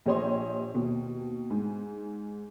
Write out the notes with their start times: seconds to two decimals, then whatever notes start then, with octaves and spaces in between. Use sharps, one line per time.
0.06 A#1 G4 C5 C#5 D#5 C6
0.74 D#2 B2
1.50 G#2